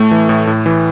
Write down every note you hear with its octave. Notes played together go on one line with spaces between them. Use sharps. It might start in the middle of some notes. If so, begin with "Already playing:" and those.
Already playing: A2 A3
E3
A2
A2
E3